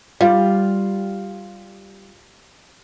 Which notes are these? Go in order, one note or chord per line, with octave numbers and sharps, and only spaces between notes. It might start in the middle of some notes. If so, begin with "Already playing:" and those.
G3 F4